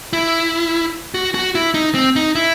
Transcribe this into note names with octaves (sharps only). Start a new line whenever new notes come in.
E4
F#4
F#4
E4
D#4
C4
D#4
E4